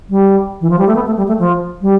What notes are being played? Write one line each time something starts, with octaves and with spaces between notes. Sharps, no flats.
G3
E3
F3
G3
A3
B3
A3
G3
A3
F3
G3